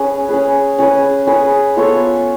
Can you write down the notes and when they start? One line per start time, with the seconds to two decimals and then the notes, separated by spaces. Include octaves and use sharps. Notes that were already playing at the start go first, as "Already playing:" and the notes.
Already playing: C#4 G#4 B4
0.29 C#4 G#4 B4
0.78 C#4 G#4 B4
1.27 C#4 G#4 B4
1.77 B3 F4 A4 C#5